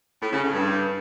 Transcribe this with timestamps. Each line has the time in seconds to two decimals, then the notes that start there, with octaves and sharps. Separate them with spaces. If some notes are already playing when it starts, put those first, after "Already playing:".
0.20 A2
0.31 C#3
0.41 A2
0.52 G2